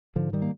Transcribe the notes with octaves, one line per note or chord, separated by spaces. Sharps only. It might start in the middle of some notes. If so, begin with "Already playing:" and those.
G#2 D3 F3
D#3 G3
A#3